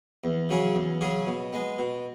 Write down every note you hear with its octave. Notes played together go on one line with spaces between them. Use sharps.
E2
C#3 F#3 C#4 G#4
E2
C#3 F#3 C#4 G#4
B2
G#3 B3
B2